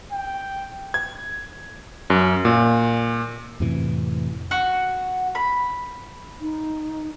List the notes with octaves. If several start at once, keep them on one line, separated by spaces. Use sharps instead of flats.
G5
G#6
F#2
A#2
F2 A2 C3 E3
F#4
B5
D#4